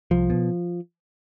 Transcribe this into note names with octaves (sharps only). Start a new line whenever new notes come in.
C2 F3
B2